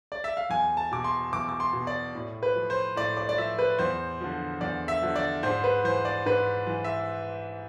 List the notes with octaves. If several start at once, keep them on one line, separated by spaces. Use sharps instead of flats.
D5
E5
F5
E2 G#5
A5
B2 D6
C6
E2 D6
D6
C6
B2
D5
A2
B4
F3
C5
A2 D5
D5
D5
F3 E5
B4
E2 C5
D3 F3
E2 D5
E5
D3 F3
D5
G#2 C5
B4
E3 C5
D5
G#2 B4
E3
E5